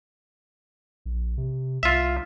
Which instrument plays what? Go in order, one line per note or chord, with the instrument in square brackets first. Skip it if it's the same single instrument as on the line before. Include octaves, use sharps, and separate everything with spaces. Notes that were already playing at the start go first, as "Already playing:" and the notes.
[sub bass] A#1
C3
[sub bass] C2 [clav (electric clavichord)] F4 E5